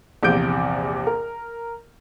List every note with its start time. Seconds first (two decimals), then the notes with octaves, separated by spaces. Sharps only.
0.23 A#1 E2 C3 G6 D7
1.07 A#4